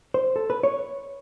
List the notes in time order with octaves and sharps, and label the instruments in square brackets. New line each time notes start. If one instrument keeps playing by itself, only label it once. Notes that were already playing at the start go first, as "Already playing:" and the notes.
[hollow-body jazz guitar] C5
A4
B4
C#5